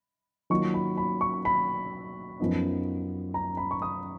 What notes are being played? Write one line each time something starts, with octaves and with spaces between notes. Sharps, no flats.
D#3 F#3 A#3 F4 C#6
B5
B5
C#6
B5
F#2 F3 B3 D#4
A#5
B5
C#6
D#6